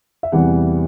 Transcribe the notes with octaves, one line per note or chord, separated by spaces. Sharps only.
E5
E2 C3 E3 G3 F#5